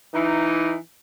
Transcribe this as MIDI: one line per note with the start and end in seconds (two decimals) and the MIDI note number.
0.14 0.76 52
0.14 0.76 63